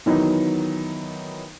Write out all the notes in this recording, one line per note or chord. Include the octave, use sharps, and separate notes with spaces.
D#3 E3 F#3 B3 D#4